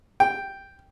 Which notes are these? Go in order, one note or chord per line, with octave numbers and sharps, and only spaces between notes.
G5